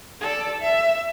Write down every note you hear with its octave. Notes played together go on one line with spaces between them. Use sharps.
A4 D5
E5